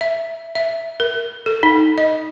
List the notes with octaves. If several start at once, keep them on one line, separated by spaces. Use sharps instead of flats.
E5
E5
A#4
A4
D#4
D#5